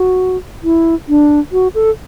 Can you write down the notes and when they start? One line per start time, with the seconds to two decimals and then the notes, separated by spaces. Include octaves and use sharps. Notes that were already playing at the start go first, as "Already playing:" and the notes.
Already playing: F#4
0.63 E4
1.08 D4
1.52 F#4
1.74 A4